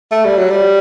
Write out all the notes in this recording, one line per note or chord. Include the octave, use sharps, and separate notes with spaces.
A3
G3
F#3
G3